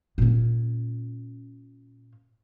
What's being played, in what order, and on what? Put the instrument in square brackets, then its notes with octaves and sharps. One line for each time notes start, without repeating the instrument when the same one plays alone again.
[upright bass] A#2 C#4